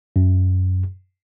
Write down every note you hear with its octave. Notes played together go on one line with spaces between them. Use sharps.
F#2